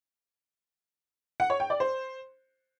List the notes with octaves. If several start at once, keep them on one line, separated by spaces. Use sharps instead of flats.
F#5
C#5
G5
D5
C5